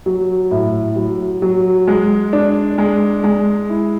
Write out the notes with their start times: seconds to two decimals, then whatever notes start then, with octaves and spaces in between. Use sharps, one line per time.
0.06 F#3
0.51 A2
0.96 F#3
1.42 F#3
1.88 G#3
2.33 D4
2.78 G#3
3.24 G#3
3.70 E4